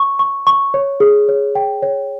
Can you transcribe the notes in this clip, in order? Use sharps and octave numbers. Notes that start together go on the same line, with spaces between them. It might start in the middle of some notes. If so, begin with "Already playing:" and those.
Already playing: C#6
C#6
C#6
C#5
G#4
C#5
G5
C#5